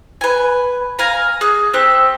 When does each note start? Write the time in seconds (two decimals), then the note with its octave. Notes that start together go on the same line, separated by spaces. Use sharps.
0.21 B4 G#5
0.99 F5 G#5 A#5
1.41 G#4 F#6
1.74 C4 G4 A4 F#6